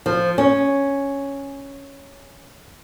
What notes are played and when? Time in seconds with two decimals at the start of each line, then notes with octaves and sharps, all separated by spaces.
0.06 F3
0.38 C#4